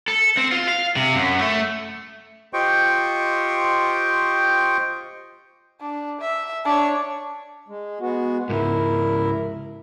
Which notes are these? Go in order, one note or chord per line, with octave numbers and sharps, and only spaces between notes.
A4
C4
F4
F5
C3
F#2
A3
F4 G4 C5 D#5 G5 C#6
D4
E5
D4 C#5
G#3
G#3 B3 F#4
C#2 G#2 E4 A#4